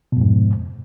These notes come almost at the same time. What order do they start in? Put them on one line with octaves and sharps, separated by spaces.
B2 F2 G#2